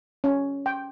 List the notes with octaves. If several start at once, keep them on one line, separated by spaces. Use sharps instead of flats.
C#4
G5